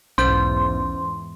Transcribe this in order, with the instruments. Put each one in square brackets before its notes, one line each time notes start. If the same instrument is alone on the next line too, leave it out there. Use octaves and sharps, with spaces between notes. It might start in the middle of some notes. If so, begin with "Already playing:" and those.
[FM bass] B1 [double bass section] E2 G#2 [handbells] C#4 C5 G6 [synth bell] C6